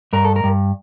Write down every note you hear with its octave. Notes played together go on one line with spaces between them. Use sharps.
G2 A#4
A4
A#4
G2